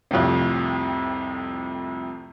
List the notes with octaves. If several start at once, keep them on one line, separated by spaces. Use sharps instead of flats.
C2 F2 A2 C3